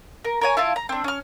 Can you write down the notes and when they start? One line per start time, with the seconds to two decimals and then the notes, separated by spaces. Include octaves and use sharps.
0.24 A#4
0.41 A#4 C#5 G#5
0.57 E4 F4 F5 A5
0.76 A#5
0.89 C4 D4
1.04 C#4 F6